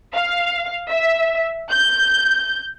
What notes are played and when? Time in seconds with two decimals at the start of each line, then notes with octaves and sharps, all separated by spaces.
0.14 F5
0.89 E5
1.70 G6